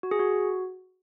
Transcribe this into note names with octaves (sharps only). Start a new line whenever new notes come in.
F#4
G#4
F#4